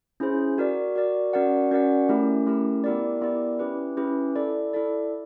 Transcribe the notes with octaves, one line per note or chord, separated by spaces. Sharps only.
C#4 E4 G#4 C5
F#4 A#4 D5
F#4 A#4 D5
C#4 F#4 A#4 D5 F#5
C#4 F#4 A#4 D5 F#5
A3 C#4 E4 G4 A#4
A3 C#4 E4 G4 A#4
B3 E4 G4 A#4 D5
B3 E4 G4 A#4 D5
C#4 E4 G4 B4
C#4 E4 G4 B4
E4 A4 D5
E4 A4 D5